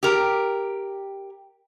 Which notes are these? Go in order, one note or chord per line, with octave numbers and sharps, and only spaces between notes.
G4 A#4